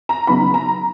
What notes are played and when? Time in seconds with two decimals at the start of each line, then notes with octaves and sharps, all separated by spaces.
0.09 A#5
0.27 C#3 F#3 B3 D#4 B5
0.54 A#5